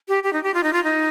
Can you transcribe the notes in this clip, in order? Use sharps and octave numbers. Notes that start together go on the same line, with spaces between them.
G4
G4
D#4
G4
F4
D#4
F4
D#4